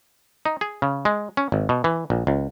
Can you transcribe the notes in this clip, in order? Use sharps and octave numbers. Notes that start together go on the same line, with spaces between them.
D#4
G#4
C#3
G#3
C#4
G#1
B2
E3
A#1
C#2